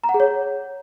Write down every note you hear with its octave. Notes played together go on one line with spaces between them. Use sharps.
A#5
F#5
G#4
C#5